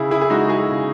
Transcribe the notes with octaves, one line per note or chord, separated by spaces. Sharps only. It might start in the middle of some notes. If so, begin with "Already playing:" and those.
Already playing: C#3 E4 G#4
E4 G#4
G#4
G#3 D#4 F#4
F#4
E4 G#4
C#3